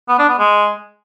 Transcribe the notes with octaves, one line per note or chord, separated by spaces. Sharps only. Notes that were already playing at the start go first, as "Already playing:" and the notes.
B3
D4
B3
G#3